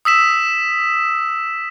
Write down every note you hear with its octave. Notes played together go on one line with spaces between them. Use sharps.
D#6 E6 B6 E7